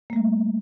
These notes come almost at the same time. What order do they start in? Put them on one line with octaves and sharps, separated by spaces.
A#3 A3 G3